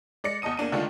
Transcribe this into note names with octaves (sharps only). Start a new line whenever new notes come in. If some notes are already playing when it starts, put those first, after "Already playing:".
G#3 D5 A#6 C#7
E2 D#5 A5 D#6 D#7
E2 A#3 D4 D#7
D3 D#3 G#3 A3 D4 F4